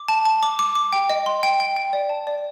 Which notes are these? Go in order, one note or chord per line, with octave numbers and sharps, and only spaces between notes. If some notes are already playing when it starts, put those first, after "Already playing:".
Already playing: D6
A5
A5
D6
D6
D6
G5
D#5
C6
G5
G5
G5
D5
A5
D5